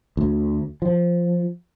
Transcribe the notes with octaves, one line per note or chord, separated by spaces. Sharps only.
D2
F3